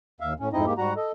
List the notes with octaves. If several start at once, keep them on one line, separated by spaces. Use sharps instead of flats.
D#2 E5 F5
A2 C#4
F2 G#2 C4 D#4 E4 D#5
G#2 G#3 A#3 G4
G#2 G3 F#4 F#5 A#5
A4 D#5